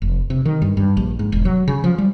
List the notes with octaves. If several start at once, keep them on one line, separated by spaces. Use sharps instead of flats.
F1
C3
D#3
G2
G2
A#1
G#2
E1
F#3
C#3
F3
G3